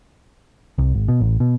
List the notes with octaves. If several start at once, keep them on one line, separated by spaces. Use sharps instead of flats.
C2
G#1
B2
A1
B2